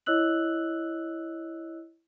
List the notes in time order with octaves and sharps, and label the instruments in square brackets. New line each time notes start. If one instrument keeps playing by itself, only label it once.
[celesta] E4 C#5 D#5 E6 F#6 F#7